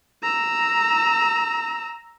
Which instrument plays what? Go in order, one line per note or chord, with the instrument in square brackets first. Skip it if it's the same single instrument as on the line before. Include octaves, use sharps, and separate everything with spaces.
[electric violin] A#5 E6